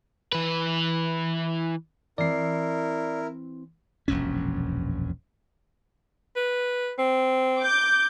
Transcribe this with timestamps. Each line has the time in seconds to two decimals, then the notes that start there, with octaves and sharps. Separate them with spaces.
0.33 E3 B4
2.18 E3 C4 E4 A#4 D5 C7
4.08 E1 A#1 F#2 C#4
6.36 B4
6.98 C4
7.59 D6 G6